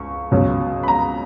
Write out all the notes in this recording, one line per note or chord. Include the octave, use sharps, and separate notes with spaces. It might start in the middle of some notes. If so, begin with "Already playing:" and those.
Already playing: C#2 C#6
C#2 B2 F#3 C#4
B5
A#5